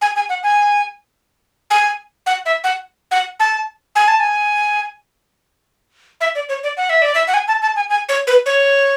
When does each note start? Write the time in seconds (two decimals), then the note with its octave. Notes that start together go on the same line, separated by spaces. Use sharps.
0.02 G#5
0.16 G#5
0.29 F#5
0.43 G#5
1.71 G#5
2.26 F#5
2.46 E5
2.64 F#5
3.11 F#5
3.40 A5
3.96 G#5
4.08 A5
4.20 G#5
6.21 E5
6.35 D5
6.49 C#5
6.63 D5
6.77 F#5
6.90 E5
7.02 D5
7.15 E5
7.28 F#5
7.34 G#5
7.48 A5
7.62 A5
7.76 G#5
7.90 G#5
8.09 C#5
8.27 B4
8.46 C#5